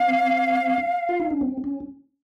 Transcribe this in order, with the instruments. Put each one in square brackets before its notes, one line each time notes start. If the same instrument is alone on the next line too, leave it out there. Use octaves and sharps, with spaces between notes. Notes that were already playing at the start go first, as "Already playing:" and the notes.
Already playing: [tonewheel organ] C4 [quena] F5
[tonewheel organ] F4
D#4
C#4
C4
C#4